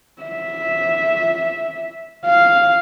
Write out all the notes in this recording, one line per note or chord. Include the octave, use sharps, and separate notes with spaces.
E5
F5